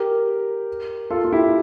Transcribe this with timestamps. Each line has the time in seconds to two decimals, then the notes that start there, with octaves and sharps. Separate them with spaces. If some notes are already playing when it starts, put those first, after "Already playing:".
Already playing: G4 A#4
1.10 F4 A4
1.24 F4
1.32 E4 G4